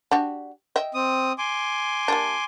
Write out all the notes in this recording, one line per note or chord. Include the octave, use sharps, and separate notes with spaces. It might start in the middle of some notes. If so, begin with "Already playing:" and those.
D4 F#4 G4
D#5 E5 G5
C4 D#6
G#5 C6 D6
G3 A#3 D4